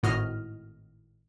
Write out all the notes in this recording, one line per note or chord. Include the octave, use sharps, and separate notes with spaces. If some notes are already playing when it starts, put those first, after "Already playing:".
G#1 A2 F#4 D#5 F6